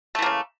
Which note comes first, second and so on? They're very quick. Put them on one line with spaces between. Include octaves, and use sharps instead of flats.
A3 E3 A#3 C#3